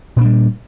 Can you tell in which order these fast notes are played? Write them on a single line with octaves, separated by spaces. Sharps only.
A#2 D4 G3